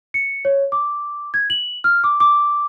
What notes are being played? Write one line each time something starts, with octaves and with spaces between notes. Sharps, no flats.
C#7
C#5
D6
G#6
F#7
F6
D6
D6